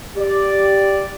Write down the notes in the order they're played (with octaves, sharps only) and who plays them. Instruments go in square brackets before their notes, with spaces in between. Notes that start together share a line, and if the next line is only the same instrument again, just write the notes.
[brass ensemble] G4 D5